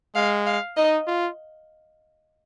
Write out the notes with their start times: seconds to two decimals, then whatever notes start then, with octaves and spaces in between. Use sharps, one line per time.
0.15 G#3 F5
0.46 F5
0.77 D#4 D#5
1.07 F4